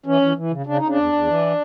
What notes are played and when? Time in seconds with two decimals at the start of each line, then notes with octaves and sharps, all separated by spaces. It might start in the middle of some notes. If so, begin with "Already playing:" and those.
0.06 E3 C#4
0.21 E3
0.36 E3
0.51 C#3
0.66 C#3 D4
0.77 D#4
0.82 C#3
0.88 D4
0.96 E2
1.12 E2
1.27 E3